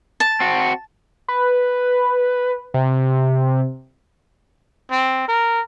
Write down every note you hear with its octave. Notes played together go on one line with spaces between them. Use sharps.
A5
C4 F#4
B4
C3
C4
A#4